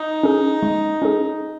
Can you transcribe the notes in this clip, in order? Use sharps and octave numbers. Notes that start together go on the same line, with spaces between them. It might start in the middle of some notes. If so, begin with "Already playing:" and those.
Already playing: D#4
C#4 G#4
G#3
C#4 G#4